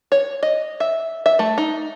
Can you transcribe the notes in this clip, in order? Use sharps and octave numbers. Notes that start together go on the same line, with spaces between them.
C#5
D#5
E5
E5
A3
D#4